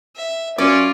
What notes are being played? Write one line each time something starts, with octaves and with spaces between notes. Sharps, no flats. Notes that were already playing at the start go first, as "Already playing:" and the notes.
E5
F#2 C#4 F4 D5